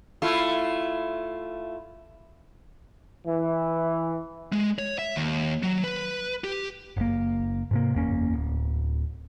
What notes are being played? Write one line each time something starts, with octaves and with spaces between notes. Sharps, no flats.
A3 E4 F4
E3
G#3
C#5
E5
D#2
F#3
B4
G4
F#1 A#3
G#2 C3 A#3
F#1 E2 A#3 C#4
D1